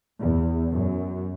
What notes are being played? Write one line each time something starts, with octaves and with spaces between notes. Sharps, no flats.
E2
F#2